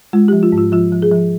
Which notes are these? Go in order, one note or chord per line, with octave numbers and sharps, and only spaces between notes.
G#3 F4
G4
F3
F4
G#2
F4
F3 F4
F3
G#4
F3